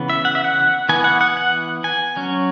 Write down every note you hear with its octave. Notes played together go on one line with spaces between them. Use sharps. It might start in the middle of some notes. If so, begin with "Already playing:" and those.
Already playing: C#3 E3 B3
E5
F#5
E5
F#5
E3 B3 G#5
F#5
F#5
F#5
G#5
F#3 C#4